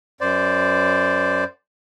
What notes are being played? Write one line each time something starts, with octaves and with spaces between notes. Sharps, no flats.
F#2 C5 D5